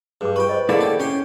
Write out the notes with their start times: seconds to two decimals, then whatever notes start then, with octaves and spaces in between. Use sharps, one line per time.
0.21 G2 G#4 D6
0.36 F4 B4 G5 C#6
0.49 C5 D#5
0.69 D3 A#3 E4 G#4 A4 C#5 D5
0.81 G4 A4
1.00 C#4 C#5 G5 C6